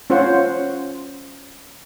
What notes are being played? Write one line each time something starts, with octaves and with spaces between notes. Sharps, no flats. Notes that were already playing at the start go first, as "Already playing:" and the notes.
C#4 F4 C5 C#5 F#5